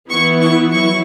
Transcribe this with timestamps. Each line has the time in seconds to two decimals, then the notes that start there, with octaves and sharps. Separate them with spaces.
0.10 E3 B3 E4 C#6
0.41 C#6
0.71 F#3 E4 C#6